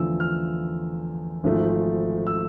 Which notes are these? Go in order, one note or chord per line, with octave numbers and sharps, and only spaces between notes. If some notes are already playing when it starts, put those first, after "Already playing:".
Already playing: E2 D3 F3 A3 E6
F6
G#1 G#2 F3 A3
E6